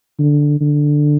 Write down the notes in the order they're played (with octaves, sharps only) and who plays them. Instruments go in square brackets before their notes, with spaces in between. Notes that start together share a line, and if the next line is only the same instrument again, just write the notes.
[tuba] D3
D3